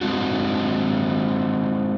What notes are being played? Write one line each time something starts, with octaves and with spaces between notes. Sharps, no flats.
G#3 C4 D4 F#4